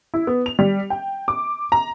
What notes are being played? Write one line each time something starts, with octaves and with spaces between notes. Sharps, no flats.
E4
B3
F7
G3
G5
D6
A#5